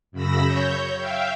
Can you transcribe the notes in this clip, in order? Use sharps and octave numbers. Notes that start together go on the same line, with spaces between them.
F#2 C#3 B5 E6 A#6
C#5 G6
E5 F5 G5